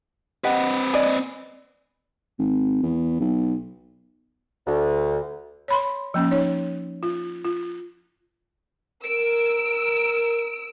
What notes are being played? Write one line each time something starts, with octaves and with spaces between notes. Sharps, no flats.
C4 G4 B4 D#5 F#5
D5 D#5 G#5
G#1
E2
B1
D2
C#5 B5 C6
F3 A#3 C#4
D#4 C#5
F4
F4
A#4 E6 D7